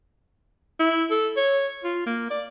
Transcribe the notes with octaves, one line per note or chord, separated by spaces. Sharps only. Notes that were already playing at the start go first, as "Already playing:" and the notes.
E4
A4
C#5
F4
A#3
D5